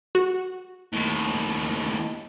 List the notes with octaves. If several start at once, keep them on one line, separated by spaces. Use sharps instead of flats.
F#4
D#2 A2